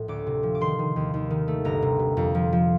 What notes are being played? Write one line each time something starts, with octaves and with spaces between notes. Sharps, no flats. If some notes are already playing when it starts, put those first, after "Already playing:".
Already playing: A#1 A2
D2 D6
C3
F3
D6
D#3 C6
D#3
D#2
D#2
D#3
A3
G1 A#5
C3
C3
F2
F3
F3